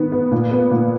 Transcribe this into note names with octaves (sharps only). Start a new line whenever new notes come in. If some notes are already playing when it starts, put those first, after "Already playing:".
Already playing: D#3 B3
B3
A#2
B3
A#2